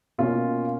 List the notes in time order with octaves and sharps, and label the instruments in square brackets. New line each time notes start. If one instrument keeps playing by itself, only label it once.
[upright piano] B2 A#3 C#4 F4